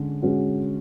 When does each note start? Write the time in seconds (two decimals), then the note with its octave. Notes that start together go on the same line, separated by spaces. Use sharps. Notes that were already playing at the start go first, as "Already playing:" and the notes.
Already playing: D3 G#3 C#4
0.22 G#3 C#4 F#4